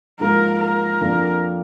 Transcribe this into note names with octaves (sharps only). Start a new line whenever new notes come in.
G#2 F3 A#3 A#4
A#4
F2 F3 A#3 D4